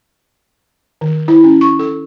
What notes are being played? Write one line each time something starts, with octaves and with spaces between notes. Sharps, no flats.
D#3
E4
C#4
C#6
A4